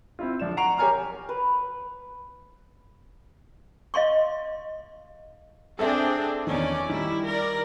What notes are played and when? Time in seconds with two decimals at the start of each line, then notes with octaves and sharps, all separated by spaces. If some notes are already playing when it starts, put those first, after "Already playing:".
0.19 C4 E4 F4
0.39 D1 F3 D4 E7
0.57 F#5 A#5 C#6 C7 D7 F7
0.78 G4 A#4 C#5 G#5 A#5 F6
1.29 B4
3.94 D#5 F5 C6 C#6
5.79 C4 D4 G#4 A4 E5
6.47 E2 D#3 C#4 D5
6.90 D#3 G3 E4
7.25 A#4 D5